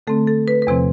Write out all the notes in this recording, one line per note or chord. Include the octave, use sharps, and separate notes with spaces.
D3 A3 C4 A4
A4
B4
B4
E2 C3 F3 C4 C5